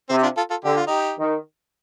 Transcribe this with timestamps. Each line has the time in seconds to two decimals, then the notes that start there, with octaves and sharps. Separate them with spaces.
0.09 C3 C4
0.17 G4
0.23 D4 F4
0.37 F4 A4
0.50 F4 A4
0.64 D3 G4
0.76 F4
0.87 D#4 G4
1.19 D#3